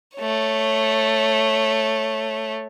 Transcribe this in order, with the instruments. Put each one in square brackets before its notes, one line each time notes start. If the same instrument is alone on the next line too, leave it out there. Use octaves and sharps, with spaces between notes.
[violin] A3 C#5